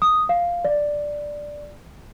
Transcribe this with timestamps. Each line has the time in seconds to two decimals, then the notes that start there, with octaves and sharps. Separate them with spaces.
0.02 D#6
0.29 F5
0.65 D5